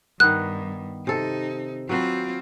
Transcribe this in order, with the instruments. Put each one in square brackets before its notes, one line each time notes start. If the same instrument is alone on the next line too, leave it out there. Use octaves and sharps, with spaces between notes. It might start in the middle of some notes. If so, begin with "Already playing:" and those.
[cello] G2 [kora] D#3 B3 [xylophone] F#6
[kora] C3 A4 [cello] D#4
[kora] F#3 B4 G5 [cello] C4 F4